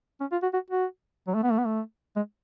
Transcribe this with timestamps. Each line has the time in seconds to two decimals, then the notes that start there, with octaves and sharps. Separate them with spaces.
0.21 C#4
0.32 F4
0.42 F#4
0.53 F#4
0.70 F#4
1.27 F#3
1.34 A3
1.43 B3
1.51 A3
1.58 B3
1.65 A3
2.16 G#3